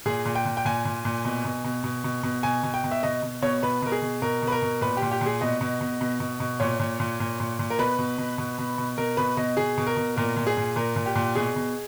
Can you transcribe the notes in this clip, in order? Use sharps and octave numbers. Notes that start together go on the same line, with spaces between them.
A#2 G#4
A#2
G5
A#2
G5
A#2 G#5
A#2
A#2
B2
B2
B2
B2
B2
B2
B2 G#5
B2
G5
B2
E5
B2 D#5
B2
B2 C#5
B2 B4
B2 A#4
G#4
B2
B2 A#4
B2
B4
A#4
B2
A#2 B4
G4
A#2
G4
A#2
G#4
B2 D#5
B2
B2
B2
B2
B2
A#2 C#5
A#2
A#2
A#2
A#2
A#2
A#4
B2 B4
B2
B2
B2
B2
B2
B2 A#4
B2 B4
B2 D#5
B2 G#4
B2
A#4
B2
A#2 A#4
A#2
G#4
A#2
A#2 A#4
A#2
G4
A#2
B2 G#4
B2